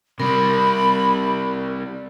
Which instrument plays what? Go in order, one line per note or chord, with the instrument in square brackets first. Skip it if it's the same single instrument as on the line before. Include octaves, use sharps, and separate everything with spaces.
[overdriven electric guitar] C3 G3 [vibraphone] A#4 [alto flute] B5